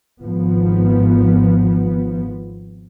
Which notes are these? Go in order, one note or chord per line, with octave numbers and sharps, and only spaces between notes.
G#1 F3 B3